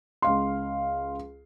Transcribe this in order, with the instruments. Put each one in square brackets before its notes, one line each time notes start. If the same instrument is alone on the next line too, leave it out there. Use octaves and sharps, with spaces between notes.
[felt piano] C#2 F5 C6